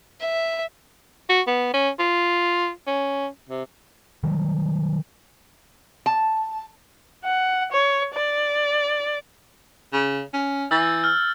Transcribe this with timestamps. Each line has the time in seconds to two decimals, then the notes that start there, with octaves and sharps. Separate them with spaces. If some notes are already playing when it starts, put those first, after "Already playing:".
0.21 E5
1.30 F#4
1.47 B3
1.74 C#4
1.99 F4
2.87 C#4
3.50 C3
4.24 D#3 F#3 G3
6.06 A5
7.24 F#5
7.72 C#5
8.14 D5
9.93 C#3
10.33 C#4
10.71 E3 E6 G6 A6
11.04 F6